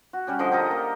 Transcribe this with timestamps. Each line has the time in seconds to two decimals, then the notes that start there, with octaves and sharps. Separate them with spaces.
0.13 F#4
0.27 G3 C#4 G4
0.39 D3 F3 D#5
0.52 G4 A4 A#4 D#5
0.71 A#3